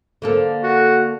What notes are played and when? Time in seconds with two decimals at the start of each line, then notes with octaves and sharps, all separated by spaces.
0.22 D3 A#3 A4
0.64 F#4